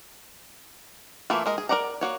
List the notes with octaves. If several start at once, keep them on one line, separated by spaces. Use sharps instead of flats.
E3 A3 A#3 E4 F4
G#3 A#4 D#5
G#4
A#4 C5 D5 F#5 A#5
A#3 F#4 C#5